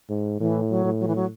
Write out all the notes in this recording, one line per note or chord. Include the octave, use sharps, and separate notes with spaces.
G#2
A2 E3
F#3
A2
F#3
E3
F#3